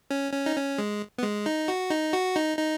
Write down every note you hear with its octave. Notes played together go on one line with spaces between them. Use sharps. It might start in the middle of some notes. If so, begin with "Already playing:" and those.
C#4
C#4
D#4
C#4
G#3
B3
G#3
D#4
F#4
D#4
F#4
D#4
D#4